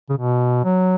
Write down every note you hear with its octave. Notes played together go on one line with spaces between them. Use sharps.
C#3
B2
F#3